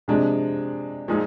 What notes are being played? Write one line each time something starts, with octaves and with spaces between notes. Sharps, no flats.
C3 F3 G#3 D4
A#2 F3 G#3 D#4